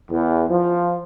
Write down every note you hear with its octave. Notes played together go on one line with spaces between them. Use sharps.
E2
F3